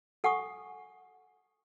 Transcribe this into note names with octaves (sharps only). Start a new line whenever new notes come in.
A4 F#5 G#5 C#6 D#6